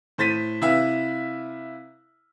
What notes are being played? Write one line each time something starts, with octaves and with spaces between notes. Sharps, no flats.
A2 C5 A6 B6 D#7
C3 E4 B4 E5 F5